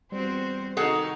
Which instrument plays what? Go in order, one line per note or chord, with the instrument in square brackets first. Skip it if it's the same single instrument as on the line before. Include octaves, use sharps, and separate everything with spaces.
[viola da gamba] E2 C4 F#4 [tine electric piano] G3 [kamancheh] C5
[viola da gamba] C3 D#3 G3 [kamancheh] D#4 F#4 [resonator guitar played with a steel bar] G#4 A4 F#5